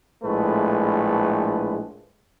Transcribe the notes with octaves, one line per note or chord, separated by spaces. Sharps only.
A#1 A2 G#3 A3 B4